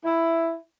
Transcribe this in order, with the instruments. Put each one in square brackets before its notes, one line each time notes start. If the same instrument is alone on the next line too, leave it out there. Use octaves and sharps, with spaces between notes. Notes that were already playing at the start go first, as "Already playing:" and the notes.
[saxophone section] E4